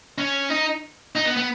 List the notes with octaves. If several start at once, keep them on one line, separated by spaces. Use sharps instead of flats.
C#4
D#4
D#4
B3
B3